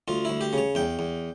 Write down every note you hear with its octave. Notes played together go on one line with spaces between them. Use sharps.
D2 F4
D2 E4
G4
C#3 C#5
E2 G5
E2